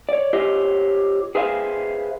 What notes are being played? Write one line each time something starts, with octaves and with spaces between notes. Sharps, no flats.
C#5 D5
F4 G4 C5 C#5 D#5
G#4 B4 C5 E5 F5